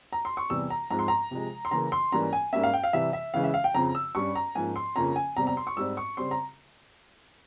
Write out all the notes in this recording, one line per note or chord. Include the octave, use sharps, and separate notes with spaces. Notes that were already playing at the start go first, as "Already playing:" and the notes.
A#5
C6
C#6
E2 C3 E3 G3 E6
A#5
G#2 F3 G#3 C4 A#5
C6
A#5
C3 F3 G#3
C6
C#3 E3 A#3 A#5
C6
G#2 E3 G3 A#3 C#4 A#5
G#5
G#2 G3 A#3 C#4 E5
F5
G5
F5
C3 E3 G3 E5
E5
C#3 E3 G#3 C#4 F5
E5
F5
G5
F2 C#3 F3 C4 A#5
E6
G2 G3 C#4 C#6
A#5
G#2 F3 A#3 C#4 G#5
C6
F2 C#3 F3 A#3 C#4 A#5
G#5
E2 C3 G3 C4 A#5
A#5
C6
C#6
G#2 G3 C4 E6
C#6
C#3 G3 C4 C6
A#5